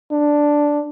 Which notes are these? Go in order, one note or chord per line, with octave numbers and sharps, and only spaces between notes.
D4